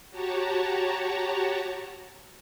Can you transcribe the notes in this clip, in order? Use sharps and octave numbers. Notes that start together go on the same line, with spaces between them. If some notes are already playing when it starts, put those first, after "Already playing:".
F#4 G4 C#5 A5 A#5